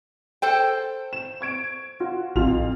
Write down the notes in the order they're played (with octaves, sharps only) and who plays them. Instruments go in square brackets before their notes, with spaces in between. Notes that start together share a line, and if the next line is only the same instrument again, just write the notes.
[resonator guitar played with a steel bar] A4 C5 G5
[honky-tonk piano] E7
C#6 G#6 D7
F4 F#4
[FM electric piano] A1 [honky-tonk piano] F2 F4 F7